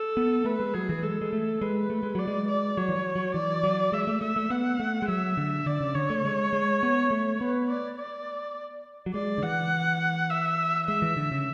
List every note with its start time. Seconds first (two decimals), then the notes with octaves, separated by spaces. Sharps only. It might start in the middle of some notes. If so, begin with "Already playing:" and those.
Already playing: A4
0.17 B3
0.45 A3 B4
0.60 G#3
0.74 F#3 G#4
0.89 E3
1.03 G#3 A4
1.21 G#3
1.33 A3
1.61 G#3 B4
1.90 A3
2.03 G#3
2.15 F#3 D5
2.27 G#3
2.48 D5
2.77 F#3 C#5
2.89 E3
2.96 F#3
3.16 F#3
3.34 E3 D5
3.63 F#3
3.92 G#3 E5
4.07 A3
4.21 A3 E5
4.36 A3
4.50 B3 F#5
4.80 A3
5.02 G#3
5.08 F#3 E5
5.37 D3
5.66 D3 D5
5.81 C#3
5.95 D3 C#5
6.10 A3
6.25 G#3
6.53 G#3
6.83 B3
7.11 A3
7.40 B3 B4
7.69 D5
7.98 D5
9.06 F#3
9.14 G#3 D5
9.38 D3
9.42 E3 F#5
10.30 E5
10.87 G#3 E5
11.02 E3
11.17 D3
11.31 C#3